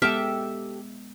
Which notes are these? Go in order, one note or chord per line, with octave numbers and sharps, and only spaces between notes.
G#3 B3 G4 A4 E5 G5 F6